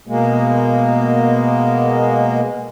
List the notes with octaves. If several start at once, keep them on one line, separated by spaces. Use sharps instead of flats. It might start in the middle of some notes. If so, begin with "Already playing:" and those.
B2 G#3 A#3